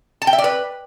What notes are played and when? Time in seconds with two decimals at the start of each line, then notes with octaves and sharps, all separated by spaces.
0.22 A5
0.27 G5
0.33 E5
0.38 D5
0.44 B4